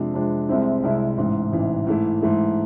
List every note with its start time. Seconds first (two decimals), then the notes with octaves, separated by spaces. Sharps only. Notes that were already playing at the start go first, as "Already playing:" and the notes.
Already playing: F2 C3 G#3 D4
0.14 F2 C3 G#3 D4
0.49 C2 C3 G#3 C4 E4
0.83 C2 C3 G#3 C4 E4
1.18 A1 G#2 E3
1.52 A1 G#2 E3
1.86 G#2 E3 A3 E4
2.21 G#2 E3 A3 E4